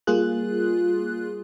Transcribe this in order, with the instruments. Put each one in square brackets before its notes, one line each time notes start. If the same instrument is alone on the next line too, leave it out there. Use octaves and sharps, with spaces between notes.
[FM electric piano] G3 A#3 F4 G#4 F#6